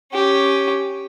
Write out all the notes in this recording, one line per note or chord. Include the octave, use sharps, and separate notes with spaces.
C#4 G4